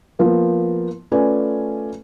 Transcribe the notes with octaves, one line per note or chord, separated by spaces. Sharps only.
F3 A#3 B3
A3 C#4 F4 B4 D5 G#5